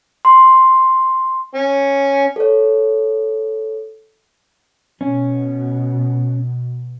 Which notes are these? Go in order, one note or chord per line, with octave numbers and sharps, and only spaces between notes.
C6
C#4
A4 C#5
B2 C#4